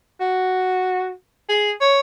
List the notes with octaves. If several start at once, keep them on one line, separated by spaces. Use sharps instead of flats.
F#4
G#4
C#5